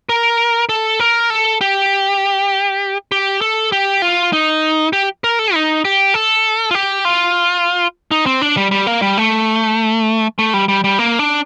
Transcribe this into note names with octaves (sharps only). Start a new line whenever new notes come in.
A#4
A4
A#4
A4
G4
G4
A4
G4
F4
D#4
G4
A#4
A4
D#4
G4
A4
F4
G4
F4
D#4
C4
D4
G3
G3
A#3
G3
A3
A3
G3
G3
G3
A#3
D4